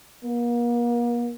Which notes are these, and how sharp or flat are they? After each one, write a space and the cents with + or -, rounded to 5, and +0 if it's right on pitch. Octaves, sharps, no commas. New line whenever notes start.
A#3 +40